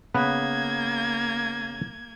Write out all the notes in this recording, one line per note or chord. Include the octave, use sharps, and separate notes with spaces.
C#3 A#3 B3 B4 G#6